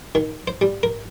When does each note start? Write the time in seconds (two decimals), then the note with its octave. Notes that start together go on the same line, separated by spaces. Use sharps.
0.15 D#3
0.48 C5
0.61 G3
0.83 A#4